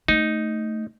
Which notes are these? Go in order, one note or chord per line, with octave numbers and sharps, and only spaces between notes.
A3 D#4